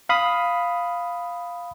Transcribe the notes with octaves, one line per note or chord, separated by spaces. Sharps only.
F5 B5 D#6